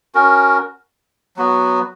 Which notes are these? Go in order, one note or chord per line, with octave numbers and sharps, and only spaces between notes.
C#4 F#4 A#4
F#3 B3 F#4